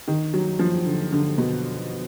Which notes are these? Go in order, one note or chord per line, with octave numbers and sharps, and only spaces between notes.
D#3
F#3
F3
D3
D3
B2